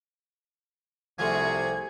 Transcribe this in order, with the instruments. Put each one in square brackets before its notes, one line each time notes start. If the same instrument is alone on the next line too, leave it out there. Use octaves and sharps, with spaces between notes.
[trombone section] C2 C3 [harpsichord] F3 A3 F4 [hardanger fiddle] F#4 G#4 [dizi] G#6